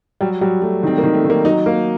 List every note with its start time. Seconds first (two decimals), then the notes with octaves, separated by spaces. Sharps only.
0.21 F#3 G3
0.41 F#3 G3
0.62 F#3 A3
0.83 D#3 C4
0.98 A#3
1.03 D#3
1.14 A3
1.24 D#3
1.30 A#3
1.45 F#3 D#4
1.66 A#3